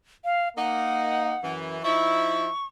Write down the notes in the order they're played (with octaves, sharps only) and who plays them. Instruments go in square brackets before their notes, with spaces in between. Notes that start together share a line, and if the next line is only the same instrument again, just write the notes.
[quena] F5
[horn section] A#3 D#4 [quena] F#5
[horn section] F#2 E3
[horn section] F3 D#4 E4 [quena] C#6